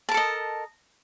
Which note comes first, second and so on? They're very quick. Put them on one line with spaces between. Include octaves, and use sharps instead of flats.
A5 A#4 A4 D#5